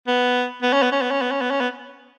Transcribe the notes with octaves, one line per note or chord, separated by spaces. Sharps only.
B3
B3
C#4
B3
C#4
B3
C#4
B3
C#4
B3
C#4
B3